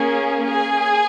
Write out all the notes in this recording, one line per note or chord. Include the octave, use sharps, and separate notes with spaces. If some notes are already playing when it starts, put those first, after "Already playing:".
Already playing: A#3 C#4 G#4
G#4 G#5